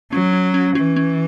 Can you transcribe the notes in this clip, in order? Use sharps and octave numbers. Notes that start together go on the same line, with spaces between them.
F#3 C#4
C#4
C#4
E3 C#4
C#4